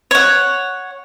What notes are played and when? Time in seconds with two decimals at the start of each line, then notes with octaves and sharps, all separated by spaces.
0.11 C#5 F#5